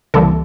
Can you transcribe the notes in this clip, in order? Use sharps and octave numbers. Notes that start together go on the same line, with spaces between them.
C#2 C3 E3 G3 A#3 A4